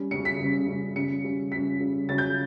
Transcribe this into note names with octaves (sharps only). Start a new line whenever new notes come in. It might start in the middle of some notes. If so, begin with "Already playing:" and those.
Already playing: G3 C#4
C#3 G3 C#4 C#7
B6
C#3 G3 C#4
C#3 G3 C#4
C#3 G3 C#4 C#7
C#3 G3 C#4
C#3 G3 C#4 B6
C#3 G3 C#4
C#3 F#3 C#4 A6
G6